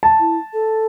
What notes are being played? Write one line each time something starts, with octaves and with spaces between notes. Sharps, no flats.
A5
E4
A4